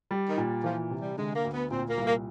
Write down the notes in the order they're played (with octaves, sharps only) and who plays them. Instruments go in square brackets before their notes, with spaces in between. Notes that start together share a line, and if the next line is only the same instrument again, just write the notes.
[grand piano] G3
[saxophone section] D#3
[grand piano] A#2
[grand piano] E3 [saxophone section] F3
[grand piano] C3
[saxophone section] G3
[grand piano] D3 [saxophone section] G#3
[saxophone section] A#3
[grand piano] D2
[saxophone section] B3
[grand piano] A#2 [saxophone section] C4
[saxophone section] A#3
[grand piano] C2
[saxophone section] A#3